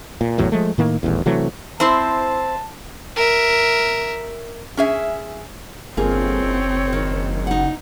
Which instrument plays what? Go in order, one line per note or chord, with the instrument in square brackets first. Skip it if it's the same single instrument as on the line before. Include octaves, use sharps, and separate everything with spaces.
[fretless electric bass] A#2
F#1 E2 A2 F#3
F3 G#3 A3
A2 D#3 A#3
D#1 A1 E2
C3 E3 F#3 A3
[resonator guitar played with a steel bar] C4 E4 C5 [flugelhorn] A5
[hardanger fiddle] A#4 E5
[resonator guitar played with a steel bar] C#4 G#4 E5
[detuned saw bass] G1 [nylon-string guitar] A#3 F4 G#4 [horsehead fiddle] C4 C#5
[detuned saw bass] F#1
[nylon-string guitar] D#3
D#4 F#5